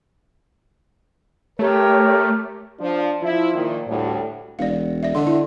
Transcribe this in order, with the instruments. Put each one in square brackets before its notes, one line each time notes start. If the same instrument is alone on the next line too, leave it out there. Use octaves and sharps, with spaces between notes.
[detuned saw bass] A3 [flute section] G4 [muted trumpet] A#4 [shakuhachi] C#5
[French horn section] F3 [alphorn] D4
[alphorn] F3 [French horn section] E4
[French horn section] A#2 D#3
[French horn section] D2 G3 [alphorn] A2
[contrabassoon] E1 [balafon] D5 F5
[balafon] D5 E5
[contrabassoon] D3 [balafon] D#5 C6
[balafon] E4